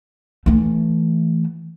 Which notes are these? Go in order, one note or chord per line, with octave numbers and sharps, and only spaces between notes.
E3 A3